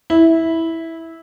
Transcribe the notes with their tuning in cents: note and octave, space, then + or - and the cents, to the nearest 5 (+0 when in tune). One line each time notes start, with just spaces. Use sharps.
E4 -10